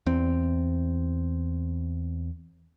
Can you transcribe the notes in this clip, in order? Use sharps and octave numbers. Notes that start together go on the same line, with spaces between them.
E2 C4